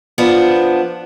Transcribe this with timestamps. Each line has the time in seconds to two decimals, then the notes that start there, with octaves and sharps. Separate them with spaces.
0.18 F3 B3 D4